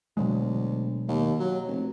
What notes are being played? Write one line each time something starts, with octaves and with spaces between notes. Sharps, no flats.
D2 B2 F#3 G#3
D#2
F#3
F1